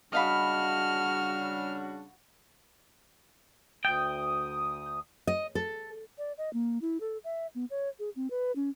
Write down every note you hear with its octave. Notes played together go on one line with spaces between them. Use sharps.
C#3 G3 D4 F#4 D#5 F5 B5 F6
D2 G5 D#6
D#5
A4
D5
D#5
A#3
E4
A4
E5
B3
C#5
G#4
C4
B4
C#4